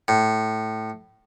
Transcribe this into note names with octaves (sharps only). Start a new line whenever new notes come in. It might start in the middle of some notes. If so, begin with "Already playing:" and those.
A2